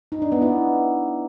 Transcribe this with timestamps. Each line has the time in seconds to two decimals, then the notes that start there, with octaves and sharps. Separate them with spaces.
0.12 D#4
0.22 D4
0.32 B3
0.42 E4